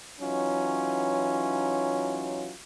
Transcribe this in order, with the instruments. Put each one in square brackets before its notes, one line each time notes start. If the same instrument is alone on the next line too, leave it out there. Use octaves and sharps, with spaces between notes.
[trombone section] E3 F#3 C#4 D#4 F4